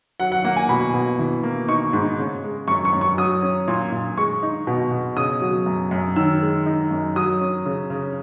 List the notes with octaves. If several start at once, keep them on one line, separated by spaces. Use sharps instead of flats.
F#3 F#5
F#5
A#3 F#5
G#5
B2 B5
B2
E3
A#3
D#4 C#6
G#2
C#3
G#3
F#2 C#6
C#6
F#2
C#6
F#3 D#6
C#4
A#2
A#2
G#3 C#6
D#4
B2
B2
C#3 D#6
F#3
F#2
F#2
D#3 E6
G#3
D#4
F#2
F#3 D#6
C#4
C#3
C#3